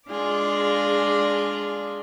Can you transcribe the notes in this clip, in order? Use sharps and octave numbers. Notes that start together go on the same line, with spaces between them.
G#3 D4 F4 G#4 D5